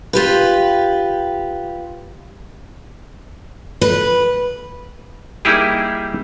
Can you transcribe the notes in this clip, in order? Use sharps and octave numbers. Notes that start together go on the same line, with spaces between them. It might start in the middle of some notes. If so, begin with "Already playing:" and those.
F4 G4 B4
B4
G3 A#3 D#4 E4 G4 G#4